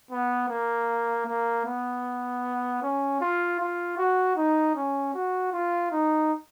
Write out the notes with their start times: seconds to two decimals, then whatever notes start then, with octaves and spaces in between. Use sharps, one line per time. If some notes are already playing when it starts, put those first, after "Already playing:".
0.11 B3
0.49 A#3
1.27 A#3
1.66 B3
2.82 C#4
3.21 F4
3.60 F4
3.97 F#4
4.36 D#4
4.76 C#4
5.14 F#4
5.52 F4
5.91 D#4